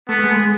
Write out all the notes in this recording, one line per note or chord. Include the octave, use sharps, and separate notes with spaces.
A3 B3
A3
G#3